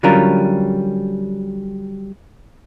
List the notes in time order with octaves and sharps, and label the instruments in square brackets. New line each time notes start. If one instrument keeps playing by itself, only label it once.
[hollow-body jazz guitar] D3 F#3 G3 C#4 F4 A#4